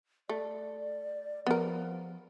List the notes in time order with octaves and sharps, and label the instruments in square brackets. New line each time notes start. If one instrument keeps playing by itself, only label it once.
[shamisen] A3 [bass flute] D5
[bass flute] F3 [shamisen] B3 A#4